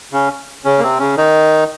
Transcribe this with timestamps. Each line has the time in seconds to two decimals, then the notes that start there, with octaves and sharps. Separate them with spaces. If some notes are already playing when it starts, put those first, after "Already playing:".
0.12 C#3 C#4
0.65 C#3 C#4
0.79 A#3
0.83 C3 C4
0.99 C#3 C#4
1.17 D#3 D#4